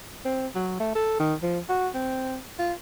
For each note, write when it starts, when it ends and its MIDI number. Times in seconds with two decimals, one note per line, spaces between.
0.25 0.47 60
0.55 0.77 54
0.80 0.92 57
0.95 1.17 69
1.20 1.35 51
1.43 1.59 53
1.69 1.89 66
1.95 2.37 60
2.59 2.73 65